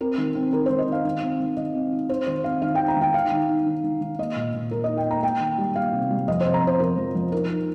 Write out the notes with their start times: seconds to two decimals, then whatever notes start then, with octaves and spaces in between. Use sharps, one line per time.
0.01 C4 A#4
0.18 D#3
0.35 C4
0.52 D#3 A#4
0.66 D#3 C5
0.79 D#5
0.88 D#3 F5
1.05 D#3
1.22 C4
1.40 D#3
1.57 D#3 D#5
1.75 C4
1.92 D#4
2.09 C4 C5
2.27 D#3 C5
2.44 C4 F5
2.62 D#3 F5
2.75 D#4 G5
2.88 A#5
2.97 D#3 G5
3.14 D#4 F5
3.32 D#3
3.49 D#4
3.66 D#3
3.84 D#3
4.01 D#3
4.18 A#3 D#5
4.36 A#2
4.54 A#2
4.71 A#2 A#4
4.84 D#4 D#5
4.97 G5
5.06 A#3 A#5
5.23 A#3 G5
5.40 D#3
5.58 G3
5.75 A#3 F5
5.93 C3
6.11 G3
6.28 F2 D#5
6.41 C3 C5
6.54 A#5
6.63 C3 C5
6.80 F2 A#4
6.98 F3
7.15 F3
7.32 D#4 A#4
7.50 D#4